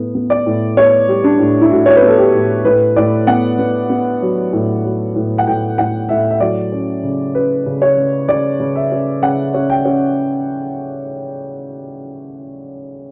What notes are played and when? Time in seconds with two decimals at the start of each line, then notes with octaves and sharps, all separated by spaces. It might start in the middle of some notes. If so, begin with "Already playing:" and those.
Already playing: A2 B3
0.15 B3
0.30 D5
0.46 A2
0.77 B3 C#5
1.08 G3
1.24 D4
1.39 A2
1.61 E4
1.71 A2 F#4
1.86 C#5
1.96 B4
2.02 B3
2.07 A4
2.18 G4
2.33 A2
2.65 A2 B4
2.96 A2 D5
3.27 B3 F#5
3.59 B3
3.90 B3
4.22 F#3
4.53 A2
4.84 F#3
5.15 A2
5.38 F#5
5.47 A2 G5
5.78 A2 F#5
6.09 A2 E5
6.31 E5
6.40 F#3 D5
6.72 C#4
7.03 C#3
7.35 C#4 B4
7.66 C#3
7.82 C#5
7.97 C#3
8.29 C#3 D5
8.60 C#3
8.76 E5
8.91 C#4
9.22 C#3 F#5
9.54 C#4
9.70 G5
9.85 C#4